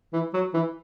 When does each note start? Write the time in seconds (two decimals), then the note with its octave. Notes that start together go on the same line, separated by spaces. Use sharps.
0.13 E3
0.34 F#3
0.54 E3